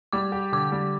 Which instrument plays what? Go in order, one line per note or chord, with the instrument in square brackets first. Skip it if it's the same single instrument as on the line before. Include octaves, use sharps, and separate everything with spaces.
[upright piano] G3 [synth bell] D6
[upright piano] G4
[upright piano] D3 [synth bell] D6
[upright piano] G3